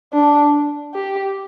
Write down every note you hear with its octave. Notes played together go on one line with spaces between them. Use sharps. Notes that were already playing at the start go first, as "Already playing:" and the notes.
D4
G4